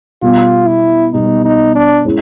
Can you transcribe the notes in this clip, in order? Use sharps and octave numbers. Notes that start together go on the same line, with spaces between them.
B2 G3 B3 F4
E4
B2 G3 B3 D#4
D#4
D4
G#3 C#4 E4